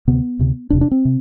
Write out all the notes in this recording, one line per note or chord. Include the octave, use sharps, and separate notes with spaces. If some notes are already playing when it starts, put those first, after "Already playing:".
D2 C3 B3
D2 C3
E1 E2 C3 D4
D4
C4
C3